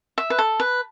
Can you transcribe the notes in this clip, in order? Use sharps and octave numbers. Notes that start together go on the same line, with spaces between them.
E5
B4
A4
B4